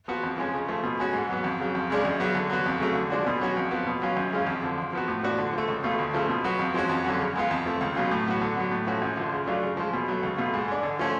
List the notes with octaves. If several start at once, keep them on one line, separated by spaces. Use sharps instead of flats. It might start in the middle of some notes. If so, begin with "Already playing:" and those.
F3 B3 F#4
F2
F3 G#3 C#4
C#3
F3 A3
B2
G#3 C#4 F#4
G#2
F#3 B3
F2
C#3 F#3
F2
C#3 G#3 D4
F#2
C#3 F#3 B3 F#4
D3
F#3 B3 F#4
F2
C#3 F#3 A3
D3
F3 G#3 D4 F#4
B2
F#3 C#4 F#4
F2
F3 B3
B2
F#3 C#4 F4
F#2
C#3 G#3 C#4 F4
F2
D3 F3
F2
F3 B3 F#4
A2
F3 B3 D4 F#4
D3
F3 A3
C#2
B2 A3 F4
D2
C#3 F3 A3
B2
F#3 B3 F#4
F2
F3 G#3 C#4 F#4
F2
D3 F#3 C#4 F#4
C#3
G#3 B3 F4
F2
F3 A3
C#2
B2 F#3 C#4 F4
A2
F#3 B3 F#4
D3
F#3 B3
A2
F3 A3 C#4 F#4
F#2
D3 F3
C#3
F#3 A3 D4 F4
C#3
F3 G#3
B2
F#3 A3
C#2
B2 A3 F4
G#2
G#3 D4
D3
F3 A3 C#4